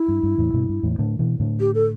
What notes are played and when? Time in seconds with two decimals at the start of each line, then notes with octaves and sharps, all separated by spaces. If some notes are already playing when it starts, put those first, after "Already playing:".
Already playing: E4
0.08 G2
0.23 G2
0.38 E2 A2
0.54 G2 B2
0.69 G2
0.83 E2 A2
0.99 A2 D3
1.19 B2 E3
1.40 A2 D3
1.60 G4
1.75 A4